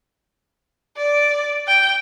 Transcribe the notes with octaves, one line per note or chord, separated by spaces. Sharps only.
D5
G5